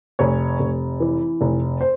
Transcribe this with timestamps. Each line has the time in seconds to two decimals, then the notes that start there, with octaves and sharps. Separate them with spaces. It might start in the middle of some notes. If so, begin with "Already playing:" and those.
0.19 F1 C#5
0.59 F1
1.00 E3
1.41 F1
1.81 C5